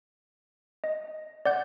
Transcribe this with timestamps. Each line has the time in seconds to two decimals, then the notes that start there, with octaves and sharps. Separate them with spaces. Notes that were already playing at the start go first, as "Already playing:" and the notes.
0.84 D#5
1.45 D5 F#5 G6